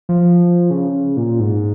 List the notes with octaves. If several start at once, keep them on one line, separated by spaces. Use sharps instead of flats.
F3
C#3
A#2
G#2